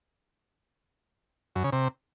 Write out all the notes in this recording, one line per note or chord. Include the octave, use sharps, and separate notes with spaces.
F#2
C#3
C3